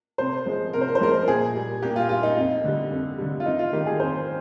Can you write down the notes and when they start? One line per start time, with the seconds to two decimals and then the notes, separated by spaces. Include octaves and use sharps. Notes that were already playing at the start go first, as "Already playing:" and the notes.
0.18 C3 C5
0.46 F3 G#3
0.73 C3 A#4
0.81 C5
0.88 A#4
0.95 C5
1.00 F3 G#3 A#4
1.28 A#2 G#4
1.55 G3
1.82 A#2 G4
1.96 F4
2.09 G3 F4
2.23 D#4
2.37 F2
2.64 D3 G3
2.91 F2
3.18 D3 G3
3.40 F4
3.45 F2 D#4
3.59 F4
3.73 D#3 G3 G4
3.86 G#4
4.00 F2 C5